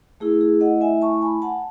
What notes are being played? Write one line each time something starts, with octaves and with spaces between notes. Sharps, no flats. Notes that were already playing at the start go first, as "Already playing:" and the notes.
A3 E4 G#4
G#4
D#5 F#5
E5 G#5
A5 C#6
G#5 B5
F#5 A5